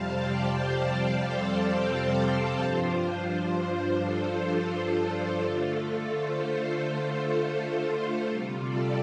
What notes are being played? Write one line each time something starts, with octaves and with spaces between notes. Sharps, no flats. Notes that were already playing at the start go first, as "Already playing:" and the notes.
Already playing: F2 C3 G3 C4 F5 A5
D5 G5
C5 F5
A4 D5
A4 D5
C5
G2 F3 D4 F4 C5
C5
A4
D3 A3 F4 A4
C5
C5
C5
A4
C3 G3 F4
A4 D5